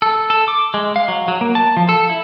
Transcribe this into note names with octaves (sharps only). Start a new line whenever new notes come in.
A4
A4
D6
G#3
F5
F#3
F#3
A#3
A5
F3
A4
E4